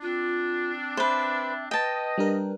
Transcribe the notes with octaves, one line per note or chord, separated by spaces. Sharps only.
C4 D4 F4
B4 C5 E5
B4 D#5 G5 A5
G3 D4 A#4